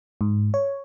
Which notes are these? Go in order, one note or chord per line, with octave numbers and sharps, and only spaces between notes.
G#2
C#5